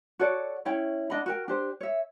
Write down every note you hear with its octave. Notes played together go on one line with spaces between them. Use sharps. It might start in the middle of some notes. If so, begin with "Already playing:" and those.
F#4 A4 C#5 D5
C#4 E4 C#5 G5
D4 D#5 F#5 B5
F#4 A#4 G5
D4 G4 C5
C#5 E5